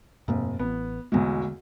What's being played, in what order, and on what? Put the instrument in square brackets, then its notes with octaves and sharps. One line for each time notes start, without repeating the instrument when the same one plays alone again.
[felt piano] F1 [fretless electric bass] G2 B2 A#3
[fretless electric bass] A1 [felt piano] B3
[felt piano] B1 E2 B2 [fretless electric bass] D3 G#3 A3